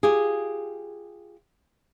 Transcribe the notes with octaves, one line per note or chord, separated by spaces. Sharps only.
F4 G4 G#4